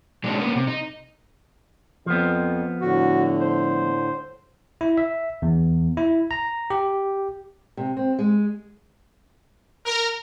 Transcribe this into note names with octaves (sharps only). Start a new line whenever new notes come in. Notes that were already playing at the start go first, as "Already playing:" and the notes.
F#3 G#3 C4 D4 D#4
A#3 B3 C#4
C3
D#4
F2 F3 B3
A2 D3 F#4
C5
E4
E5
E2
E4
A#5
G4
C3
C4
G#3
A#4